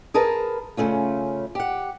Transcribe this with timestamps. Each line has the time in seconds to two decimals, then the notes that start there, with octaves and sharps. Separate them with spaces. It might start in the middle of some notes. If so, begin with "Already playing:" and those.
0.14 G#4 A#4 B4 A5 A#5
0.77 C#3 A3 C#4 F4
1.55 G4 F#5